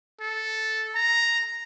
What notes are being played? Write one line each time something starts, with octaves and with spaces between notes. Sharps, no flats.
A4
A#5